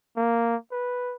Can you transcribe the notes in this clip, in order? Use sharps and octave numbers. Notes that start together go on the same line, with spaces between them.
A#3
B4